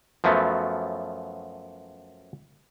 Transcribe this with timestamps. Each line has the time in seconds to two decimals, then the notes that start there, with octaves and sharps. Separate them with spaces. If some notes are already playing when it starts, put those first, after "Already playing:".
0.24 F#2 F3 F#3 A3 B3